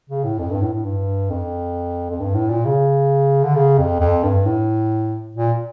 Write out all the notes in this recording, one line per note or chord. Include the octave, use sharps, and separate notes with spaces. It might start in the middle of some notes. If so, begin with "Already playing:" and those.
C#3
A2
F2
G2
A2
A2
G2
F2
F2
G2
A2
A#2
C#3
D3
C#3
F2
F2
G2
A2
A#2